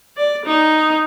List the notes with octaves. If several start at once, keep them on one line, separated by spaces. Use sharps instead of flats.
D5
D#4